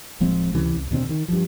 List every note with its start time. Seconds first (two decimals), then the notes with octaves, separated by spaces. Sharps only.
0.20 D1 F3 G#3 C4
0.53 C#2 C3 E3 C#4
0.77 C2
0.91 D#2 B2 D3 C4
1.09 D#3
1.28 G2 F3